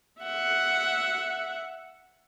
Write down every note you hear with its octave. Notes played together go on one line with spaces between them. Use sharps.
E5 F#5